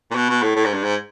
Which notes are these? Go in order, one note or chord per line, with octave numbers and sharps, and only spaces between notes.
A#2
B2
B2
A2
A2
G#2
G2
G#2